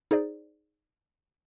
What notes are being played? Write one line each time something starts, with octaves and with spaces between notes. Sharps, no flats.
D#4 G#4 C5 D5